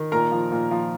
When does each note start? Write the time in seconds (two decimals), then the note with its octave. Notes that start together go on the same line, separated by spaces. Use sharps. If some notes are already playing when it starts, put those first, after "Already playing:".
Already playing: D#3
0.12 A#2 A#4 A#5
0.32 F3
0.51 A#2
0.71 F3